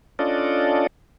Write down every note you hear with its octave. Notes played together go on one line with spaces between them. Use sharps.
C#4 D4 F4 A4 D5 D#5